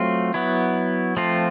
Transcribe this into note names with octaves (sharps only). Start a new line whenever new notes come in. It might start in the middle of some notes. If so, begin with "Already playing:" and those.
Already playing: F#3 A3 C4 F4
F#3 B3 E4
F3 A3 C4 F4